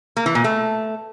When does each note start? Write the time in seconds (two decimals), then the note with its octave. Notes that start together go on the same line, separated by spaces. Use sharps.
0.17 A#3
0.26 E3
0.35 A#2
0.44 A3